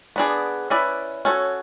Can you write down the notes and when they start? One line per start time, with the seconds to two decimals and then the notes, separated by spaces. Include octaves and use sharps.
0.16 B3 D4 G#4 D5
0.70 C#4 E4 B4 D5
1.25 C#4 F#4 A4 C#5